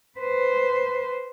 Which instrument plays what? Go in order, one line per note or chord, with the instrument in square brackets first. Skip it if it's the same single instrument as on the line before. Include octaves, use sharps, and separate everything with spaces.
[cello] B4 C5